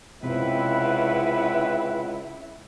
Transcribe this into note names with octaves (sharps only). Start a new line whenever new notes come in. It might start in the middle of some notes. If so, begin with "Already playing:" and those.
C#2 C3 C4 E4 B4 F#5